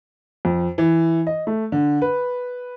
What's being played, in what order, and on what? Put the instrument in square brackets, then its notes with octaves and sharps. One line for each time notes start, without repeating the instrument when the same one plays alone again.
[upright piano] F2
E3
D#5
A3
D3
B4